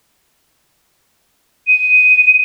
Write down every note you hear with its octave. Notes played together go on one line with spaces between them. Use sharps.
D#7